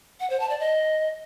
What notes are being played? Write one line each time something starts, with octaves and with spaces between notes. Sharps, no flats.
F#5
C5
A5
D5
D#5